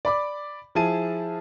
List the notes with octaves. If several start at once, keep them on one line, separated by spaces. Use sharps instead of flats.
D5 B5 D6
F3 E4 G#4 A5 D#7